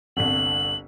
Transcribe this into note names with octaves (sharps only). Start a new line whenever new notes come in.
G1 C2 F#7